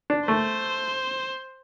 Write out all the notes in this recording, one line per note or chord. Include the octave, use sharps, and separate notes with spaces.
D4
A3 C5